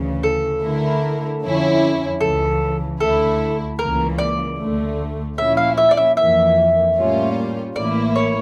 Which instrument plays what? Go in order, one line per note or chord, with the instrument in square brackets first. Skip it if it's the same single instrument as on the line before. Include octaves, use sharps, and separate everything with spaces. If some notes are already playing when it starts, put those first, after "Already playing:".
Already playing: [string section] D2 C#3 E3
[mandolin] A4
[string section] D3 A3 E4 A#4
F2 D3 F3 C#4 E4
[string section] C#2 C#3 E3 [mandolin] A4
[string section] D2 D3 A3 E4 [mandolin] A4
[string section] C#2 C#3 E3 A#3 [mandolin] A#4
[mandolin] D5
[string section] D2 D3 A3
[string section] A#2 F3 C#4 E4 [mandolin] E5
[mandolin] F5
E5
D5
E5
[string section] F2 E3 A#3 [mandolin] E5
[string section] A2 G3 A#3 C#4 F4
[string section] A1 A2 E3 A#3 E4 [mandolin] D5
[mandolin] C#5